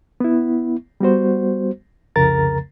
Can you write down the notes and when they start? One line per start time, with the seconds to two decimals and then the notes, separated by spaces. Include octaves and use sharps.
0.20 B3 E4
1.00 G3 B3 F#4 C5
2.16 C2 F2 C#3 A#4 A#5 A6